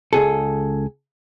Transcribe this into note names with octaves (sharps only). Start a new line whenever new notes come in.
C#2 G#4 A4